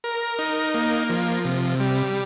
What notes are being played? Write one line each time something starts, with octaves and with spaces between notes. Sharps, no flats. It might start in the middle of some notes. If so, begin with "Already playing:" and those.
A#4
D#4
A#3
F3
C3
G3